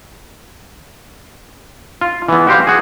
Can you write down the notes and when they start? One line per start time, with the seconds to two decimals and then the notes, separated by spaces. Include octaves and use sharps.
2.01 F4
2.28 E3 B3
2.47 F#4 G4 C5 F5
2.67 F#4 G#4